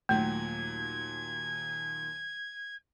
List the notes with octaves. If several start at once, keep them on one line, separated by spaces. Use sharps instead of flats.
D#2 A#2 F#3 A3 G#6